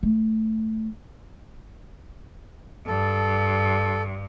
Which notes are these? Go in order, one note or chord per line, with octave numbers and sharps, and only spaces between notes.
A3
G2 A4